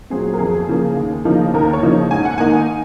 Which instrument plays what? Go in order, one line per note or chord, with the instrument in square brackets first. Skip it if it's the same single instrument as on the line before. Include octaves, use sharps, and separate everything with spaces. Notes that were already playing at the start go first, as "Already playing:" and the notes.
[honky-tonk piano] A#2 F#3 C4 G#4
A#4
F2 G#4
C#3 F3 A#3
D#2
C#3 F3 A#3 D#4
D#2 A#4
C#5
C#3 F3 A#3 D#4
G#2 G#5
F#5
D#3 A#3 D#4 G#5